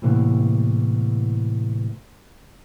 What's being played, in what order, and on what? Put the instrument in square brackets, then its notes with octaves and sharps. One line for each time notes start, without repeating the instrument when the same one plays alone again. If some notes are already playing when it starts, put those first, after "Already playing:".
[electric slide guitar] A2 C3 E3 A#3 B3